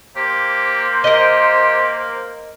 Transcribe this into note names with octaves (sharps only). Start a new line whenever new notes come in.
A#3 G4 C5
G4 A#4 D#5